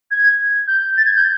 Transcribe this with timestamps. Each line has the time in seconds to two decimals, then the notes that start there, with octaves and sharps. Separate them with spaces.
0.11 G#6
0.68 G6
0.97 A6
1.06 G#6
1.16 G6